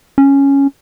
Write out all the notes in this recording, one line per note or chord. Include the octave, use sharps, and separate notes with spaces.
C#4